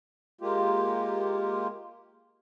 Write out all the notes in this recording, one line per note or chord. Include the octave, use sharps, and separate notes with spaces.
G#3 A#3 F4 G4